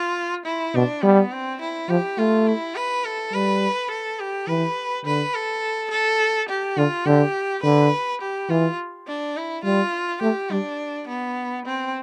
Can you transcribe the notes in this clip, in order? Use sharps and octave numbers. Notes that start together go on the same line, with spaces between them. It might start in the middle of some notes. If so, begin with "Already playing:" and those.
Already playing: F4
E4
B2 D4
G3 B3
C4
E4
F3 G4
A3 F4
E4
B4
A4
G3 B4
A4
G4
E3 B4
D3 B4
A4
A4
G4
D3 F4
D3 G4
D3 B4
G4
E3 F4
D4
E4
G3 F4
A3 G4
G3 D4
B3
C4